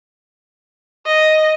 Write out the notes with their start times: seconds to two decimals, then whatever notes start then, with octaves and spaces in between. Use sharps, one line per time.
1.06 D#5